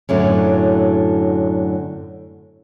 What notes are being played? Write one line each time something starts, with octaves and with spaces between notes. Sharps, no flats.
F#2 A2 D3 F#3